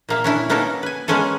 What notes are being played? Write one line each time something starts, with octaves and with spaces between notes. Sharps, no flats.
A#2 A#3 E5
C#4 D4 E4
A#3 B3 C#4 D#4 A4 A#4
B4 G#5
G#3 A#3 B3 C#4 G#4 A4